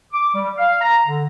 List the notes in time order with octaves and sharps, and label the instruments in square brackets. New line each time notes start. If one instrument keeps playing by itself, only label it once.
[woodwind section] D6
G3
F5
A#5
D3